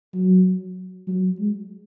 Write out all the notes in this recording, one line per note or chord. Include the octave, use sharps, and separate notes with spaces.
F#3
F#3
G#3